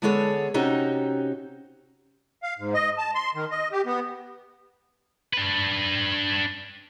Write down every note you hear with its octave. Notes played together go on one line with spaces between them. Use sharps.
D3 G#3 B3 G#4 A4 C#5
C3 C#4 D#4 F#4 G4
F5
G#2
D#5
A5
C6
D#3
D#5
G4
B3
D4 B4